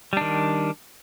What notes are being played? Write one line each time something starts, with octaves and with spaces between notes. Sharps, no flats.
D#3 G3 D4